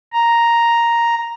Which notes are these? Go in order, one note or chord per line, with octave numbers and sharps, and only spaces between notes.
A#5